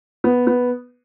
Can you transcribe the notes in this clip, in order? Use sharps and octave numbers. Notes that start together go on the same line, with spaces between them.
B3
B3